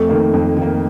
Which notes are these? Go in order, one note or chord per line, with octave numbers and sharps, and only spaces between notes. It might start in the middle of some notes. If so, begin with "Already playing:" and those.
Already playing: F2 A3
D#3 A#3
F2
D#3 A#3